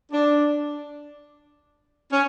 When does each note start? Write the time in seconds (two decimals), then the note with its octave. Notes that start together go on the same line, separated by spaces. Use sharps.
0.12 D4
2.12 C#4